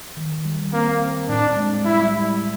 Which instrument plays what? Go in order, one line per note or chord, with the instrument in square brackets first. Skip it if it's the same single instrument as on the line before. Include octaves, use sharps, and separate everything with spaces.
[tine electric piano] D#3
G3
[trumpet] A#3 [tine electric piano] C4
[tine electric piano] C4
[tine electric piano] A2 [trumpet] D4
[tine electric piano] G#3
[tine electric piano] G3 [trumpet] E4
[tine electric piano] G3